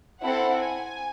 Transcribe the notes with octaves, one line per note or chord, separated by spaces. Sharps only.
C4 E4 A4 F#5
G#5